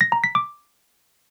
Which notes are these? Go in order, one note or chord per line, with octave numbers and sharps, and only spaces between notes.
A#6
A#5
B6
D6